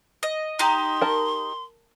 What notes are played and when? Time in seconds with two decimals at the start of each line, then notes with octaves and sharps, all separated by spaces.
0.23 D#5
0.59 D#4 G4 C6
1.01 A#4 A5